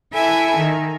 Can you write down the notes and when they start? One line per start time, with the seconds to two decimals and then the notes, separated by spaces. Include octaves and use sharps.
0.13 E4 A4 E5 G#5
0.58 D#3